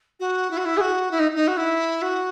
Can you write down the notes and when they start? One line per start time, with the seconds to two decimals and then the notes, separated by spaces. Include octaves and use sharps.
0.20 F#4
0.50 E4
0.57 F#4
0.65 E4
0.77 G#4
0.80 F#4
1.11 E4
1.19 D#4
1.35 D#4
1.47 F#4
1.57 E4
2.02 F#4